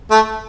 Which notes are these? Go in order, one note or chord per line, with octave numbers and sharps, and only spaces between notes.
A3